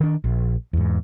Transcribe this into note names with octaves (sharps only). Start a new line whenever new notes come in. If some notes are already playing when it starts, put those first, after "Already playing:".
D#3 D4
A#1
E2 G#2